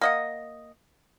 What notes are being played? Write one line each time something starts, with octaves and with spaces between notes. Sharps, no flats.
A#3 D#5 F#5